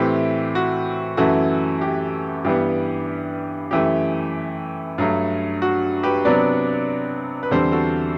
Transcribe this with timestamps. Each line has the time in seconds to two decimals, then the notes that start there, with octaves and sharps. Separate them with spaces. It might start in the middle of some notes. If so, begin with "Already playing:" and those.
Already playing: A2 E3 A3 C4 G4
0.55 F#4
1.17 F#2 E3 A3 F#4 A4
1.81 G4
2.45 G2 E3 G3 B3 G4
3.71 F#2 E3 A3 G4
4.98 G2 F#3 A3
5.62 F#4
6.03 G4 B4
6.25 C3 F#3 B3 D4 B4 D5
7.43 B4
7.51 E2 D3 G3 C4 A4 C5
7.72 F#4 A4